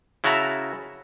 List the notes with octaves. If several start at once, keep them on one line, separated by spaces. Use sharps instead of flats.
C#3 E4 F#4 E5 A5 A#5